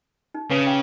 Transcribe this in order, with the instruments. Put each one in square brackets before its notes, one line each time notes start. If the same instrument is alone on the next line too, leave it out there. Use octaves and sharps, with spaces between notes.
[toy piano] D#4
[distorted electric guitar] C#3 [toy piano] B4
[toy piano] F5 G5 D6